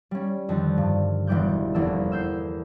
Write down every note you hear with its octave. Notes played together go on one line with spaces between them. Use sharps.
G3 C#4
F2 D3 D#3
G2
E1 E3 G3 D6 F#6 G6
F1 E2 A#3 C4 A4 E6
E6 G6 C7